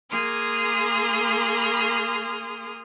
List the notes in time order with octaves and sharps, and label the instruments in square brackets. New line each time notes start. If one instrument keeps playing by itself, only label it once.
[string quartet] A#3 G#4 C6 D#6 F6